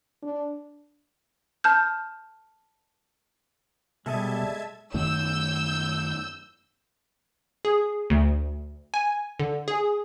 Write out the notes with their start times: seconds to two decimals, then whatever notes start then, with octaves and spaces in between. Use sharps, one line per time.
0.22 D4
1.64 A5 F6 G6
4.06 B2 G3 G#3 A4 D#5 E5 A5 G#6
4.94 F#2 D#3 A3 E6 G6
7.65 G#4
8.10 D2
8.94 G#5
9.40 D3
9.68 G#4